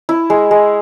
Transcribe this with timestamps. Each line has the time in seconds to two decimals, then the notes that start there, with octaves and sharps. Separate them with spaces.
0.09 E4
0.30 G#3
0.51 G#3